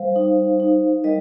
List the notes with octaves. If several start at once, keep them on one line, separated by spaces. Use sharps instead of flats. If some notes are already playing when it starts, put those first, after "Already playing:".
Already playing: G3 C5 F5
D#4
D#4
G3 A#4 D#5